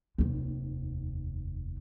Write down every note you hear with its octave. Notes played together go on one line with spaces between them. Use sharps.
F1 D#2